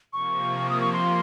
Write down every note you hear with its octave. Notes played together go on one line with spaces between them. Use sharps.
C3 F3 A#3 C#6
D#6
C#6
C6